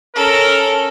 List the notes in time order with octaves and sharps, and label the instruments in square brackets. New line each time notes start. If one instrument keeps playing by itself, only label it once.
[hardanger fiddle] C#4 A4 [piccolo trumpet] A#4